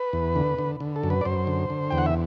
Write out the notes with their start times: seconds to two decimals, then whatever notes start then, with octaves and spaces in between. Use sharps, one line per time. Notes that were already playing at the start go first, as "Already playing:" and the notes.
Already playing: B4
0.13 E2
0.36 D3
0.59 D3
0.80 D3
0.96 A4
1.03 F#2
1.10 B4
1.21 D5
1.25 F#2 C5
1.47 D3
1.70 D3
1.91 E2 G5
1.98 F#5
2.06 E5